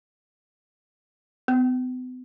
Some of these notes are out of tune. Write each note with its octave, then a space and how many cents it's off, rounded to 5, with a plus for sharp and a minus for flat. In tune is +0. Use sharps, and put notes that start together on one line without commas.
B3 +40